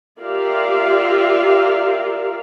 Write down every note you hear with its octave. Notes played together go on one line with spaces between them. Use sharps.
F4 G4 A#4 D5 E5 F5